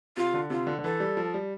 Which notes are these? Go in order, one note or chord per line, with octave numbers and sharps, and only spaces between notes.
C3 F4
D3
C3 F4
D3
D3
E3 A4
G3
F3
G3